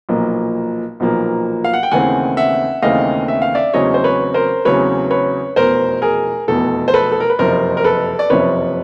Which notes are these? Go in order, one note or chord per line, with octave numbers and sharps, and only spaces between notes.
B1 A#2 F3 A#3
B1 A#2 F3 A#3
F5
F#5
G5
D#2 C#3 E3 A3 C4 F#5 G#5
E5 F#5
D#2 C#3 E3 A3 C4 D#5 F5
E5
F5
D5 E5
E2 C#3 F#3 A3 C4 C#5 D#5
C5
B4 C#5
A#4 C5
E2 C#3 F#3 A3 C4 B4 C#5
B4 C#5
F1 E2 B2 A#4 C5
G#4 A#4
F1 E2 B2 A4
C5
A4 B4
A4
A#4
B4
F#1 F2 C3 F3 A#4 C5
A#4
A4 B4
D5
F#1 F2 C3 F3 B4 C#5